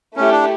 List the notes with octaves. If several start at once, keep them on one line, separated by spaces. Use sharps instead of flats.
A3 C#4 E4 G4
D4